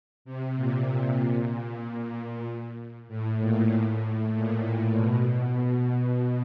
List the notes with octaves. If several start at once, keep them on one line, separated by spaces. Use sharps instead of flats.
C3
A#2
A2
A#2
A2
A#2
B2